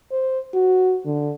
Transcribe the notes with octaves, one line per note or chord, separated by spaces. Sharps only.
C5
F#4
D3